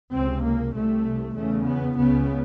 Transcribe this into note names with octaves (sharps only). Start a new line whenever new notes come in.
C#2 C3 C4
A#3
C2 C3 A3
E2 C#3 A3
B3
C#2 C#3 B3